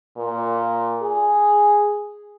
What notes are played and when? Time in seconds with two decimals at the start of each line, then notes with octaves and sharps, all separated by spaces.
0.17 A#2
1.02 G#4